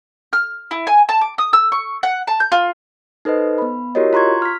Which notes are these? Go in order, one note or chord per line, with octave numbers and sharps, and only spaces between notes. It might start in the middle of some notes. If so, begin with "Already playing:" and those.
F6
E4
G#5
A5
D6
D#6
E6
C#6
F#5
A5
G6
F4
D#4 A4 B4 C5 D#5
B3 B5
E4 F#4 G4 A#4 C#5 D#5
F4 A#5 C6 C#6 G#6
F6 B6